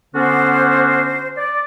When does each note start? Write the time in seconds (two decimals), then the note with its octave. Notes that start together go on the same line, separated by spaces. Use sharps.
0.14 D3 B3 C#4 D4 F#4 C5
1.37 D5